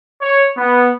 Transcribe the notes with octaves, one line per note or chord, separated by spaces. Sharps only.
C#5
B3